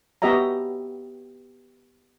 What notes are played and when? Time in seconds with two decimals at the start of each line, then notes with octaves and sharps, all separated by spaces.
0.22 B3 F#4 G4 D#5 E5 A#5